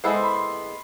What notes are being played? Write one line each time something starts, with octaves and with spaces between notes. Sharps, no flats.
G#3 B3 E4 A4 C5
C6
B5
C6